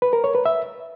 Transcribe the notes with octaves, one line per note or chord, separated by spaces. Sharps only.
B4
A#4
C#5
B4
E5